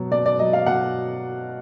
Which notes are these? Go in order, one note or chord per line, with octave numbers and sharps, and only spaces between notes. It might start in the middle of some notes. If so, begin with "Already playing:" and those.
Already playing: B2 F#3
B2 D5
D5
F#3 D#5
F5
B2 F#5